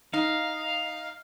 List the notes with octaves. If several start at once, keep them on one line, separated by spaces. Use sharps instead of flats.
D#4 F5